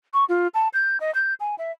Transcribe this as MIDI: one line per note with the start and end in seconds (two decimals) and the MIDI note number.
0.13 0.25 85
0.29 0.47 65
0.54 0.68 81
0.74 0.98 91
1.00 1.14 75
1.15 1.34 91
1.40 1.55 80
1.58 1.72 76